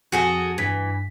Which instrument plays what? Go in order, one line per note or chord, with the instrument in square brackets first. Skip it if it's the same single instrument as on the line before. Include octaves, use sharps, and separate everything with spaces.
[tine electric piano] F2 [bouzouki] F#4 G#4 A4
[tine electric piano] G2 B6 [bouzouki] E3